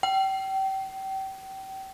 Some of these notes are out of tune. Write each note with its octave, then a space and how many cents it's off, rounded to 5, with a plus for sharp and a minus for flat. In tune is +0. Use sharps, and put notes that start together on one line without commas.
G5 -30